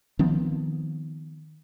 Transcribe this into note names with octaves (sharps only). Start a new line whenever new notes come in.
D#3 F3 B3 C4